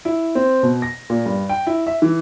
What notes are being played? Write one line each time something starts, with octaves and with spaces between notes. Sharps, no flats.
E4
C4
B2
A#6
A#2
G2
G5
E4
E5
E3